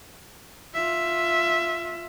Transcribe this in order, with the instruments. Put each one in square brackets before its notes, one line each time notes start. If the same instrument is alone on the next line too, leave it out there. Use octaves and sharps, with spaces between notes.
[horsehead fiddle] F4 E5